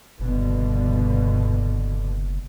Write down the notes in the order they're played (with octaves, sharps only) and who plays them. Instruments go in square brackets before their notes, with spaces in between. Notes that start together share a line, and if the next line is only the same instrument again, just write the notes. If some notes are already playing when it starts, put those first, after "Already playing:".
[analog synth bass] F#1 [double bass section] G2 B2 D3